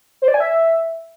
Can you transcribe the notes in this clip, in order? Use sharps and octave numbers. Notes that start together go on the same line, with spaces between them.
C5
D5
G#5
E5